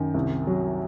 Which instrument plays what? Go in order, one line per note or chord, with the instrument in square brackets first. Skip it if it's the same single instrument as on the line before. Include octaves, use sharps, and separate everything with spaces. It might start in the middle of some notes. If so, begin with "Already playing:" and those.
Already playing: [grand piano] F#2 [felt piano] D#3
[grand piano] C2
F#3